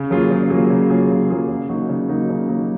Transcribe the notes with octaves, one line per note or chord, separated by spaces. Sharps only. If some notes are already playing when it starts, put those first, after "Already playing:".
Already playing: C#3
F#3 A#3 F4 G#4
C#3
F#3 A#3 F4 G#4
C#3
F#3 A#3 F4 G#4
C#3
F#3 A#3 F4 G#4
C#3
F#3 A#3 D#4 F#4
C#3
F#3 A#3 D#4 F#4
C#3
F#3 A#3 D#4 F#4